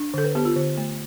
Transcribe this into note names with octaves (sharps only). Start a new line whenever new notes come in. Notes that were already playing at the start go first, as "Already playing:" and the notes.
Already playing: D4
D3 A4
B4
B3 G4
F4
D3
A3